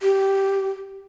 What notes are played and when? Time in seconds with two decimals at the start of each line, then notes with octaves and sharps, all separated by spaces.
0.01 G4